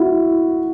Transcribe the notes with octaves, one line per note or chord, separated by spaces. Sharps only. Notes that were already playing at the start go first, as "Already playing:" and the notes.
Already playing: E4 F#4